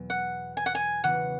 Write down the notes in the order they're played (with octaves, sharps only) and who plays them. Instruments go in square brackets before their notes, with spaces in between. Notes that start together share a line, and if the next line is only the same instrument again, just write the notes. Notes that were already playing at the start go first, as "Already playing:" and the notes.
Already playing: [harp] E2 B2 F#3 B3
[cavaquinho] F#5
G#5
F#5
G#5
[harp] C#3 E3 B3 F#4 [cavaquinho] F#5